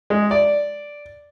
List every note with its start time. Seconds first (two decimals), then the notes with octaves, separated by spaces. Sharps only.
0.10 G#3
0.31 D5